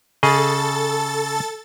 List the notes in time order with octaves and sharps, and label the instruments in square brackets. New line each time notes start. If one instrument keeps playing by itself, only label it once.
[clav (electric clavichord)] C#3 G#4 D#5 [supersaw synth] A4 A6